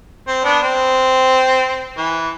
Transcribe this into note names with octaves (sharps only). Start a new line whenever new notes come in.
C4
B3 D4
C4
E3